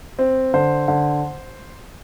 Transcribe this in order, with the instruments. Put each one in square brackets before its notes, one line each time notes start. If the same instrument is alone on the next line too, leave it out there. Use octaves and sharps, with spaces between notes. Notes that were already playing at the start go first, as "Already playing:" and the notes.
[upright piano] C4
D3 C5
D3